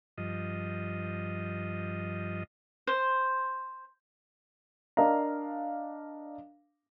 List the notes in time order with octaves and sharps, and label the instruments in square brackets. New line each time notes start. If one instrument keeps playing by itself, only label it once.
[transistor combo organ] G2 F3 D#5
[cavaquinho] C5
[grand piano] D4 A#4 D#5 F5 A#5